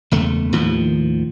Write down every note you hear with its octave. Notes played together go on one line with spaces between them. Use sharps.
F#1 E2 A3
D#2 A2 D#3 F3